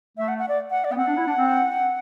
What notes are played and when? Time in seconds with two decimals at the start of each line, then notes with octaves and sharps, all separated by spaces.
0.18 A3 E5
0.28 F#5
0.38 F#5
0.48 D5
0.71 F#5
0.84 D5
0.92 B3 G5
0.97 C4 F#5
1.07 D4
1.17 E4
1.27 D4
1.37 C4